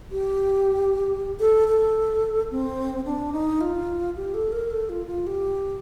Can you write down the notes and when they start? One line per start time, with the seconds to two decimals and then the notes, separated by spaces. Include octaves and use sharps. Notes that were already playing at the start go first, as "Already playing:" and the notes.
0.11 G4
1.40 A4
1.68 A4
2.51 C4
3.06 D4
3.32 D#4
3.61 F4
4.17 G4
4.34 A4
4.52 A#4
4.71 A4
4.89 F4
5.07 F4
5.27 G4